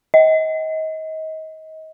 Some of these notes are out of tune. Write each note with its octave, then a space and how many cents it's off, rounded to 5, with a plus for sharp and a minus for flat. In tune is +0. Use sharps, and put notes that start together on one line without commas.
D#5 +30